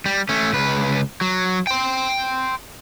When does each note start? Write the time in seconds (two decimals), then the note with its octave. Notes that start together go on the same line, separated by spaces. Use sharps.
0.06 G3
0.29 A3 C#4
0.53 C#2 B4
1.21 F#3
1.67 G5 C6